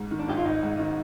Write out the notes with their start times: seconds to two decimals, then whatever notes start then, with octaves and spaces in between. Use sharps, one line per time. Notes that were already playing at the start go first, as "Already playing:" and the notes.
Already playing: G#2
0.11 D#3
0.19 D4
0.28 G#1 G4
0.37 F4
0.45 G#1 D#4
0.63 G#2
0.79 D#3